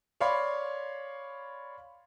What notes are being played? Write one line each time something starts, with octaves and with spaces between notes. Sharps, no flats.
C#5 D5 F5 B5 C6